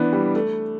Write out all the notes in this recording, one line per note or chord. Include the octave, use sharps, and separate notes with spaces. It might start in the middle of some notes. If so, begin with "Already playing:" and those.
Already playing: E3 B3 D4
G3
A3